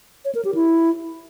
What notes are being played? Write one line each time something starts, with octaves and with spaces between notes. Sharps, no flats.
C#5
A#4
G4
E4